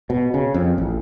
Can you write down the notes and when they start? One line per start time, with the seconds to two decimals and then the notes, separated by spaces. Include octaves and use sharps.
0.10 B2
0.34 C#3
0.54 F2
0.78 A1